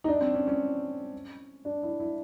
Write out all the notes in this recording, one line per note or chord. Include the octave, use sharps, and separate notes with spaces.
D#4
D4
C4
C#4
C#4
D4
E4
E4